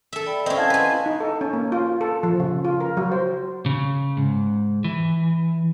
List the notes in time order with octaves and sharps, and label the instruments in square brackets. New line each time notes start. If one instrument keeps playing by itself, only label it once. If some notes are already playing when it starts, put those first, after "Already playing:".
[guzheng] A4 E5
[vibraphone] D5 G5 B5
[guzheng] C4 C#4 [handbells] D#5
[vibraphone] E4 F#5 C6 [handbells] F5 A5 G#6
[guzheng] B4 G#5
[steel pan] D#4
A4
C#4
A#3
F4
A4
F3
C#3
F4
A#4
F#3
C5
[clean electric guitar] C#3
G#2
E3